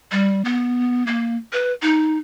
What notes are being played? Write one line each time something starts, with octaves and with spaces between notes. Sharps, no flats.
G3
B3
A#3
B4
D#4